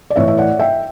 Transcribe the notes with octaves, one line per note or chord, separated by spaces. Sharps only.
D5
A2 E3 C#5 E5
E5
D5 F#5
E5 G5